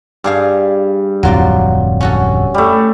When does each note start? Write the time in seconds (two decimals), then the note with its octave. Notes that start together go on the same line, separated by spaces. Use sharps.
0.24 G2 D4 G#4 F5
1.23 D1 F2 F#3 C4 F4 D5
2.01 C#4 F#4 A4
2.54 G3 A3